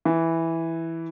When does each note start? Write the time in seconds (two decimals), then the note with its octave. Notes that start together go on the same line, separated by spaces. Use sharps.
0.05 E3